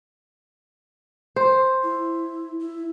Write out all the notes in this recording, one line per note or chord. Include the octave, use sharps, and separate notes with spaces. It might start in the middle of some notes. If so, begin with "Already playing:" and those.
C5
E4
E4